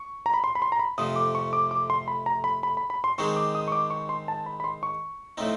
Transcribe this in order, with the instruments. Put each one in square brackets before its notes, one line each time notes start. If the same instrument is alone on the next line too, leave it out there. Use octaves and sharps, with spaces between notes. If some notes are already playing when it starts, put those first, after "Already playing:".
Already playing: [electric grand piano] C#6
A#5
B5
C6
B5
C6
A#5
B5
[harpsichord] F2 C3 F3 A3 [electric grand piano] D#6
[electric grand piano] D6
C#6
D6
D6
C6
B5
A#5
B5
B5
B5
B5
C6
[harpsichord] D#3 G#3 C4 D#4 G#4 [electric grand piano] C#6
[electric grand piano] D6
D#6
C#6
D6
C#6
C6
A5
B5
B5
C6
C#6
[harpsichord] A2 F3 A3 C4 D#4